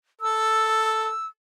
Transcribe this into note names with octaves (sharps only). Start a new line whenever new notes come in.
A4 E6